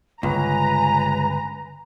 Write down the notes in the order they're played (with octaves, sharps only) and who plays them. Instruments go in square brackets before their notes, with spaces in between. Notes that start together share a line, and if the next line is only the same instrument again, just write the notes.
[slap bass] G1 [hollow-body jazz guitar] C#2 [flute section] B4 G#5 [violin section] A#5